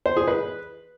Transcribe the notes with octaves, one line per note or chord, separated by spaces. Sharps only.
C5
G#4
B4